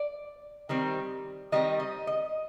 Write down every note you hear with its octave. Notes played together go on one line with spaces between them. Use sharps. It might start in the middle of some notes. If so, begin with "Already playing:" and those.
Already playing: D5
D#3 G3 C4
D#3 G3 C4 D#5
D#5
D#5